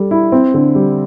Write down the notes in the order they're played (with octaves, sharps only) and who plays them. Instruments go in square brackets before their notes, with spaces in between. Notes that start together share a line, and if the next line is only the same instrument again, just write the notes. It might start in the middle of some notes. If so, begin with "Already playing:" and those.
Already playing: [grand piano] G3 A4
E4
C4
D3
G3